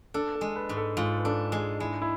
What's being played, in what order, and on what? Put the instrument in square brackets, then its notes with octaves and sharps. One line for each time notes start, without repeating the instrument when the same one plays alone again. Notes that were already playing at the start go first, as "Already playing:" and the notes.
[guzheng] D4 [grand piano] A4
[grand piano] A4
[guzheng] G#3
[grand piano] B4
[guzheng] G#2
[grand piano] A4
[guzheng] G#2 [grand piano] F4
[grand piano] B4
[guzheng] D4 [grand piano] A4
[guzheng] G#3 [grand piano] G#4
[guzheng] G#3 [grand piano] E4
[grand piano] E4